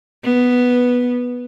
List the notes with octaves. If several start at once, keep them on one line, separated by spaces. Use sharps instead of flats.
B3